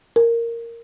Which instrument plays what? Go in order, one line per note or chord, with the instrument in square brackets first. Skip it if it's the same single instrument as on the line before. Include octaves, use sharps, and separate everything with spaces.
[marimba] A#4